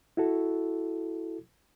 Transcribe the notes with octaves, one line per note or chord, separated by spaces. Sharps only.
E4 F#4 A4